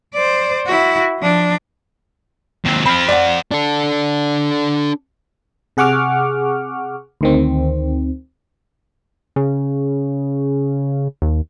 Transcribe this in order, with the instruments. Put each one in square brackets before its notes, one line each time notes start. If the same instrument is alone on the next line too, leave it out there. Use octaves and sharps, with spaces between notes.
[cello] C5 D5
E4 F#4
F3 D4
[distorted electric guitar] D#2 C4
[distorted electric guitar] C4 F5 [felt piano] B5
[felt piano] D5 F#5
[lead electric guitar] D4 A4
[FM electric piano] C3 G#4 F#5 C#6 D6 F6
D2 D#3 C4
[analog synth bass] C#3
D#2